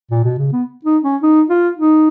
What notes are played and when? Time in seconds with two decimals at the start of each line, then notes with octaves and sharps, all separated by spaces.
0.11 A#2
0.25 B2
0.38 C#3
0.53 B3
0.85 D#4
1.03 C#4
1.22 D#4
1.50 F4
1.77 D#4